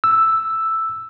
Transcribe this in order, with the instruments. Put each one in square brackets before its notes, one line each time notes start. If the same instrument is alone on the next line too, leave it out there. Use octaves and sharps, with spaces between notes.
[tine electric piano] E6